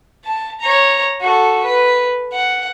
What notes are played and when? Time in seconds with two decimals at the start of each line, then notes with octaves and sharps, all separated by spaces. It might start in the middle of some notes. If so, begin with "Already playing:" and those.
0.25 A5
0.61 C#5 A#5
1.21 F#4 A4
1.63 B4
2.33 F#5